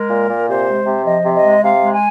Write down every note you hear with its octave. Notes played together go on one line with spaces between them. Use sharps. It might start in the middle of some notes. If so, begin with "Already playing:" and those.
Already playing: G#3 A#4
A#2
A#2
C3 C5
G#3
C3
F3 D#5
C3
D#5
G#3
C3 F5
G#3
G#5